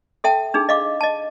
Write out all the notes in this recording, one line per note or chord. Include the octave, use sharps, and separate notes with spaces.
A4 E5 G5 A5
D4 D#4 G#4
D#5 F5 D6
D#5 A5